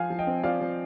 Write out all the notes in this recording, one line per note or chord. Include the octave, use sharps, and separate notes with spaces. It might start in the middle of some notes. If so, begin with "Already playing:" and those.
Already playing: F3 F5 G#5
F3
D#5 G5
C4
F3 D5 F5
F3